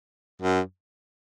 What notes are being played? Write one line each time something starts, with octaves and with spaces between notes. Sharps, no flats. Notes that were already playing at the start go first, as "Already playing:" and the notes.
F#2